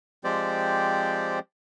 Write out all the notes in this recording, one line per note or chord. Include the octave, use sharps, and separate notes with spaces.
F3 G#3 C4 G4 C5 D5